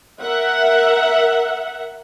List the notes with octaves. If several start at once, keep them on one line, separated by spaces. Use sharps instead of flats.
A#4 E5 F#5